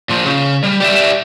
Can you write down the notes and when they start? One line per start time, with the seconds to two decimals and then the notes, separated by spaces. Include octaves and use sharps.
0.09 A#2 F3
0.25 C#3
0.63 G3
0.81 G4 D5 E5